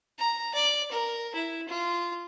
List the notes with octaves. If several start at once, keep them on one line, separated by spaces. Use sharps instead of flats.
A#5
D5
A#4
E4
F4